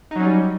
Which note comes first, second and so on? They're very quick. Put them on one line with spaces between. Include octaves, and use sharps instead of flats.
D#4 F#3 C#4 G3